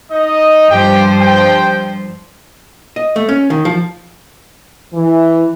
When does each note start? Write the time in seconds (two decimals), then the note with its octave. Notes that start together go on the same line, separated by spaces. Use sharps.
0.12 D#4 D#5
0.70 G2 F3 G4 C5 G5
1.21 G5
2.96 D#5
3.16 A3
3.29 C#4
3.50 D#3
3.65 F3
4.94 E3